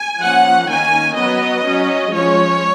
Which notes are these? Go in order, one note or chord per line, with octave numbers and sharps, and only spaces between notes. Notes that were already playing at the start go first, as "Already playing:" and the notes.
Already playing: G#5
F3 A#3 C#4 F#5
D#3 A#3 C#4 G#5
F#3 B3 D#5
F#3 C#4
F3 G#3 C#4 C#5